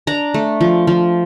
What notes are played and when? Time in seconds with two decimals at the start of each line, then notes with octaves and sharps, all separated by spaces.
0.07 D4 A#5
0.34 A3
0.61 F3
0.87 F3